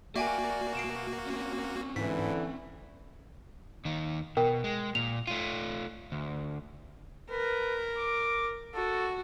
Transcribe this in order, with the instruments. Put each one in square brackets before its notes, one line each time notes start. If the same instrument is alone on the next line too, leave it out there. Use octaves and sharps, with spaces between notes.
[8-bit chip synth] A#3 F#4 [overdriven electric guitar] D5 [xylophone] E5 G5 G#5
[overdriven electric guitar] B2 [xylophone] C7 D7 E7
[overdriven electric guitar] C4 C#4
[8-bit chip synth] G#2 [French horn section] D3 E3 [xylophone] B6
[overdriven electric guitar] D#2 D#3
[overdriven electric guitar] B2 [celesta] A#4 G5
[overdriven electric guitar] G#3
[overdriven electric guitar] A#2 [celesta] F7
[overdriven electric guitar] A3 F4 [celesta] D#7
[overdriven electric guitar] D2
[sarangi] A#4 [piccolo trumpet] B4
[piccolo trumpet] D6
[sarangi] F#4 [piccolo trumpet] A4